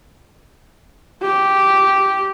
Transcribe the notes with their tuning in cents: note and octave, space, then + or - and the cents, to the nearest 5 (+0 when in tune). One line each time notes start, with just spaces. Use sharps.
G4 -10